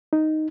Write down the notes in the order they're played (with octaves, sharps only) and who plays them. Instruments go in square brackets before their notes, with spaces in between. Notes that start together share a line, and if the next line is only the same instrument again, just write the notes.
[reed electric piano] D#4